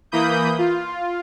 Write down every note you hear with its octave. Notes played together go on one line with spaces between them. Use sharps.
E3 A#3 B5 D#6 G6
F4